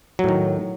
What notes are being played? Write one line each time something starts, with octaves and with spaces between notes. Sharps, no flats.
A2 D#3 F#3